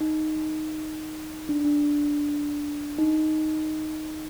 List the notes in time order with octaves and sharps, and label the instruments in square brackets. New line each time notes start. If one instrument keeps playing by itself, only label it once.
[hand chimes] D#4
D4
D4
D#4